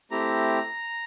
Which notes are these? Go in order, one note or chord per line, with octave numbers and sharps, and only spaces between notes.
A3 C4 E4 G4 A#5